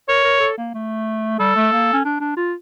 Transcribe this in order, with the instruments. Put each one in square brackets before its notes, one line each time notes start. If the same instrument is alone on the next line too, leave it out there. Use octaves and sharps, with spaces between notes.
[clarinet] A#4 [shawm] C#5
[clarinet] A#4
A4
A#3
A3
[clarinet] G3 [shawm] A4
[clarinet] A3
A#3
C#4
D4
D4
F4